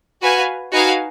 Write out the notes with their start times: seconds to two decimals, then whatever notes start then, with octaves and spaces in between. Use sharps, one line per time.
0.22 F#4 B4 F5 G#5
0.72 D#4 F#4 B4 F5 G#5